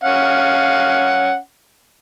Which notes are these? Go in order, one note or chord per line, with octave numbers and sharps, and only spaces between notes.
C#4 F5 F#5